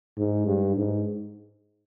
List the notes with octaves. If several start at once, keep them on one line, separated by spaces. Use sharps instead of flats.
G#2
G2
G#2